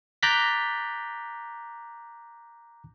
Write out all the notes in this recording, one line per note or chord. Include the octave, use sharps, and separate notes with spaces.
A#5 D6 F#6 G6 A6 B6